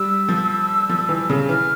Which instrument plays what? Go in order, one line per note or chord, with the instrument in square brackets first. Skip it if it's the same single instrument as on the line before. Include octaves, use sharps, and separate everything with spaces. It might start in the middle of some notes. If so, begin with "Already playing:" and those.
Already playing: [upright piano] G3 [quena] E6
[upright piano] F3
F3
E3
C#3
[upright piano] E3 [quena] F6